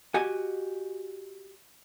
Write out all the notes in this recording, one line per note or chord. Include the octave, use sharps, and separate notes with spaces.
F#4 G4 D#5 G#5